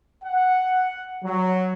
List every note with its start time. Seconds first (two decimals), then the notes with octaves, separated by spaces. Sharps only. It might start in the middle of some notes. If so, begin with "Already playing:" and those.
0.24 F#5
1.23 F#3